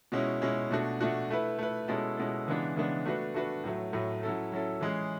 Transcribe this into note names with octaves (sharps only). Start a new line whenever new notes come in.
B2 G#3 C#4 E4
B2 G#3 C#4 E4
B2 A3 D4 F#4
B2 A3 D4 F#4
A3 E4 B4
A3 E4 B4
B2 G#3 C#4 E4 A4
B2 G#3 C#4 E4 A4
C#3 E3 G#3 B3 D4
C#3 E3 G#3 B3 D4
A3 D4 F#4 B4
A3 D4 F#4 B4
A2 F#3 A3
A2 F#3 A3
F#3 C#4 E4 A4
F#3 C#4 E4 A4
E3 G#3 C#4 G#4